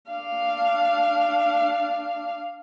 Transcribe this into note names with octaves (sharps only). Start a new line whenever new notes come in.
D4 F5